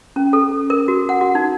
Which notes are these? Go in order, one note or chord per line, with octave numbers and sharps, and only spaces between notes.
C#4
A4
A#4
F#4
F#5
F#4
D#4